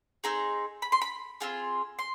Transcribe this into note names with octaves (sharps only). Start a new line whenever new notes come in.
C4 D#4 G#4 A#5
B5
C6
B5
C4 F4 G#4
C6